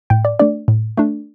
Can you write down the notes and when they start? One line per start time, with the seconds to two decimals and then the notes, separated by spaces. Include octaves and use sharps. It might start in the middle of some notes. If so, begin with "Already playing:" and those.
0.10 A2 G5
0.25 D5
0.39 A3 D4 D5
0.68 A2
0.97 A3 D4